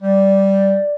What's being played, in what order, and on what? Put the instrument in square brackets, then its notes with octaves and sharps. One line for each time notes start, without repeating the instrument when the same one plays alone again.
[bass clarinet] G3 [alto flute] D5